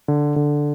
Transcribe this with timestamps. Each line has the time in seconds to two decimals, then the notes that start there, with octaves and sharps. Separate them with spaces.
0.08 D3
0.36 D3